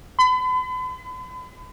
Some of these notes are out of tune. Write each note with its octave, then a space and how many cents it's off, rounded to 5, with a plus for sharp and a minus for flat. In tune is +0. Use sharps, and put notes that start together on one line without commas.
B5 +45